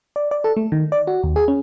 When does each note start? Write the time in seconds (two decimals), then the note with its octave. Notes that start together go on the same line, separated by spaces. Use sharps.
0.16 D5
0.31 D5
0.44 A4
0.57 A3
0.72 D#3
0.92 D5
1.07 F#4
1.23 D#2
1.36 G#4
1.48 C#4